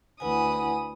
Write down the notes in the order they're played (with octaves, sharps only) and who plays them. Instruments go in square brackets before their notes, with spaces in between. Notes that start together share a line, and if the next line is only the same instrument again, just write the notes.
[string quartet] D2 B4 D#6 [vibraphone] E4 F#5 G#5